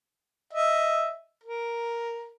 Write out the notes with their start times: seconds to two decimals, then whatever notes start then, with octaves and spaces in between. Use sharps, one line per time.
0.53 D#5 E5
1.43 A#4